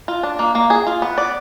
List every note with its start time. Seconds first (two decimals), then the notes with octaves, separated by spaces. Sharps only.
0.08 F4
0.23 D4
0.39 A#3
0.55 A#3
0.70 G#4
0.87 F4
1.02 B3
1.18 D5